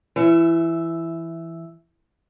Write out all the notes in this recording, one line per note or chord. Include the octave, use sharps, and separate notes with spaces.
E3 E5